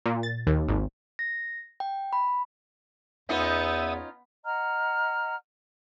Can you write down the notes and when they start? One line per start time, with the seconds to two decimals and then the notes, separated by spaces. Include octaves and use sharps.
0.06 A#2
0.23 A6
0.47 D#2
0.68 G#1
1.19 A#6
1.80 G5
2.13 B5
3.29 E2 B3 C#4 D#4 F4 E5 D#6
4.45 D#5 F#5 A#5 F6